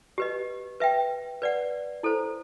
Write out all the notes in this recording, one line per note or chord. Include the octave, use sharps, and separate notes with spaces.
G4 B4 D#5
B4 E5 G5
B4 D5 F#5
E4 A4 C5